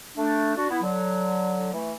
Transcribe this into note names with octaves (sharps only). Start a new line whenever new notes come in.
A3 D4
D4 F#4
B3 E4
D3 F#3
E3 A3